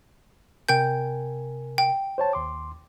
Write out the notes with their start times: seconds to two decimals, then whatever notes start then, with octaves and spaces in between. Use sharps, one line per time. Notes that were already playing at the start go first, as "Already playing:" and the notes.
0.69 C3 A#4 G5 G#5 G6
1.78 G5
2.18 C5 C#5 A5
2.33 D#2 C6 D6